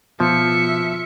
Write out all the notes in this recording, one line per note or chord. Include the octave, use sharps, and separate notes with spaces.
B2 F3 E5 C#7